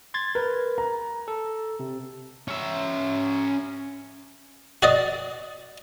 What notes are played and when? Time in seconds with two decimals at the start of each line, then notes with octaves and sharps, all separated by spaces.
0.14 C6 G#6 A6
0.35 A#4 B4
0.78 A#5
1.28 A4
1.80 C3
2.48 C#4 E5
4.83 F#4 D5 D#5